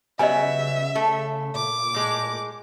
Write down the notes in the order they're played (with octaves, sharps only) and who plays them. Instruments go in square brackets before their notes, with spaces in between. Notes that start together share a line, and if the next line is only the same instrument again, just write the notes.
[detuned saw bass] C#3 [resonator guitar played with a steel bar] F#3 G3 B3 [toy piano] D#5 G#5 [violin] E5
[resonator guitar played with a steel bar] A3
[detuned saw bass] A#2 [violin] D6
[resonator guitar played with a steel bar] A2 G#3